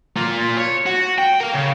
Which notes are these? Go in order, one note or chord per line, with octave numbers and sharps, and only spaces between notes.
A#3 F4
C#5
F#4
G5
A#4 F5
C#3